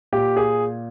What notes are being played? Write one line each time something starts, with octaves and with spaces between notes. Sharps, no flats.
A#2 G4
G#4